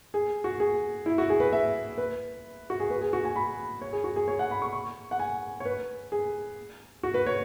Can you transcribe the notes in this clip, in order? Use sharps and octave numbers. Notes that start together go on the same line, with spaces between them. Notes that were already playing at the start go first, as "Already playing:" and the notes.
G#4
F#4
G#4
E4
F#4
G#4
B4
E5
B4
F#4
G#4
B4
G#4
F#4
G#5
B5
C#5
G#4
F#4
G#4
C#5
F#5
B5
C#6
C#6
F#5
G#5
C#5
B4
G#4
F#4
B4
C#5